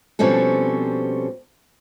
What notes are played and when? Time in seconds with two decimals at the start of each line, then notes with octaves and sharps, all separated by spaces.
0.19 B2 F3 G3 C4 C#4 A4